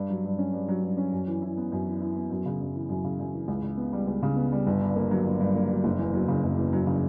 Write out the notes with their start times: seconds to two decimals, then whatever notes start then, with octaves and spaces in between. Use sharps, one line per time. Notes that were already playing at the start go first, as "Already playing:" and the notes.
Already playing: G2
0.10 F#3
0.25 G2
0.38 C#4
0.53 G2
0.68 F#3
0.83 G2
0.97 C#4
1.12 F#2
1.27 E3
1.42 E4
1.57 B3
1.72 F#2
1.87 E3
2.00 E4
2.16 B3
2.31 F#2
2.46 C#3
2.60 F#2
2.74 E3
2.89 F#2
3.04 C#3
3.19 F#2
3.33 E3
3.48 C#2
3.62 C#3
3.77 B3
3.93 G3
4.07 C#2
4.23 C#3
4.36 B3
4.52 G3
4.67 G1
4.81 G2
4.96 A#3
5.11 F#3
5.26 G1
5.41 G2
5.55 A#3
5.70 F#3
5.84 F#1
5.99 E2
6.13 F#3
6.28 C#3
6.43 F#1
6.58 E2
6.73 F#3
6.87 C#3